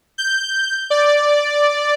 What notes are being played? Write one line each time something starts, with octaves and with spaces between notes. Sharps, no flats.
G6
D5